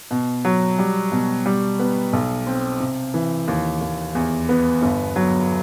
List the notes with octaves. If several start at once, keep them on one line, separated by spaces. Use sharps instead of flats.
B2
F#3
G3
B2
G3
B3
B1
C4
C3
E3
D#2
D#2
E2
B3
G1
F#3